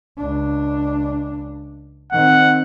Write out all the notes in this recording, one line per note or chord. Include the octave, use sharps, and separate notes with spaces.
C#2 D4
D#3 C4 F#5